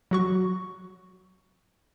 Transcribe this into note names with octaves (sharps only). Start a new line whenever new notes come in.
F#3 F#4 C#6